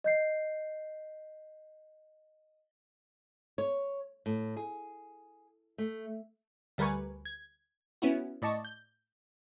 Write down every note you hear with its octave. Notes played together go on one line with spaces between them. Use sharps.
D#5 G6 C7
C#5
A2
G#4
A3
D2 G3 A#4 B4 G#5 C#6
G#6
B3 C#4 E4 F#4
A2 D5 D#5 A5 C#6
G6